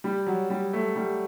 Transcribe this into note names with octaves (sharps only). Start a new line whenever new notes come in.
G3
F#3
G3
A3
G3